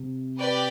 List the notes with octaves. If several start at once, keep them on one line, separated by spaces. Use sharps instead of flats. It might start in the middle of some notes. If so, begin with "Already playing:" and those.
Already playing: C3
G4 B4 D5 G5